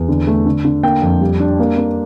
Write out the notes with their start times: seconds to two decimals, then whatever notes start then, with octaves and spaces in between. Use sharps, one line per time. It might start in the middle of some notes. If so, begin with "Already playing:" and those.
Already playing: E2
0.09 D3
0.27 A3
0.46 D3
0.65 D3
0.83 A#3 G5
1.02 F2
1.21 G3
1.40 D4
1.59 A#3
1.77 A#3